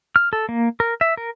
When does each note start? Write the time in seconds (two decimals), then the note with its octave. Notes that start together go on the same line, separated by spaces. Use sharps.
0.16 F6
0.33 A4
0.49 A#3
0.80 A#4
1.01 E5
1.17 A#4